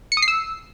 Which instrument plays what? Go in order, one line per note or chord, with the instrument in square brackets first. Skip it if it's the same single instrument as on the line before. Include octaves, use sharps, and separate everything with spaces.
[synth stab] C#7
D#6
C7
E6